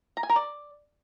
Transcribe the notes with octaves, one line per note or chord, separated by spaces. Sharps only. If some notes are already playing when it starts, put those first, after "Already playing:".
A#5
G#5
A#4
D5